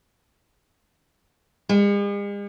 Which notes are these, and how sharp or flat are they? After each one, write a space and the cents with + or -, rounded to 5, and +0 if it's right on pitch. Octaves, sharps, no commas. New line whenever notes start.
G#3 -45